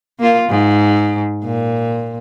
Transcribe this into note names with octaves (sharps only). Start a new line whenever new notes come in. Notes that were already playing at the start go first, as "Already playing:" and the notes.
A#3 F4
G#2
A#2